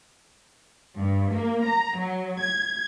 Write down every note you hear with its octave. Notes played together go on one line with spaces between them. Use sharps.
G2
A#3
A#5
F#3
G#6